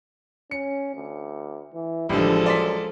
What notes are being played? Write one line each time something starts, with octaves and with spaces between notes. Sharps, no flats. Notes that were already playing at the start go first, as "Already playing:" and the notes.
C#4 C#7
D2
E3
A1 D3 F3 G3 G#3 A4
F#2 D5 C6 B6